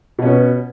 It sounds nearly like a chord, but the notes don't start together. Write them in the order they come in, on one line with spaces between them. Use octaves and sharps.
B2 C#4 B3